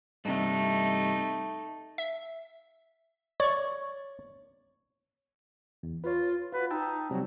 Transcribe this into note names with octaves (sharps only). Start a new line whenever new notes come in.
G2 C3 A3 D#4
E5
C#5 D5 C#6
E2
F4 B4 C#5
F4 F#4 B4
D#4 G5 A5 E6
C3 F#3 G3 C4